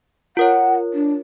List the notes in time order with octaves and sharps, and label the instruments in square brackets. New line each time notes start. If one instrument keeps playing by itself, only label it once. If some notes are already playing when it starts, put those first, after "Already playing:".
[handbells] F4 A#4 C#5 [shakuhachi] F#5
[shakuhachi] D4